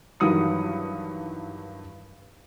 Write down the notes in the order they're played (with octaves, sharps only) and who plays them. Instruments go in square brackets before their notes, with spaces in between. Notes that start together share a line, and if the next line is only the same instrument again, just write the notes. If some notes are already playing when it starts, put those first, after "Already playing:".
[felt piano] G2 D#3 E3 F#3 D#6 C#7